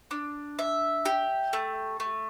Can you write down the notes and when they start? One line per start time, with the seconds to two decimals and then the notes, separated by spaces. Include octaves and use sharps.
0.11 D4
0.59 E5
1.05 G4
1.53 A3
2.00 A3